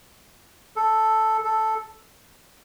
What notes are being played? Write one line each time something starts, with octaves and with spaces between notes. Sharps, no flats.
A4
A4